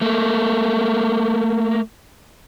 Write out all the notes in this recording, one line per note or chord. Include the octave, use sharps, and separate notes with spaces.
A3 A#3